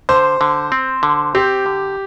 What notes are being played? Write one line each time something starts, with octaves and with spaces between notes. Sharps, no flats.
D3 C5
D3
C4
D3
C4 G4
D3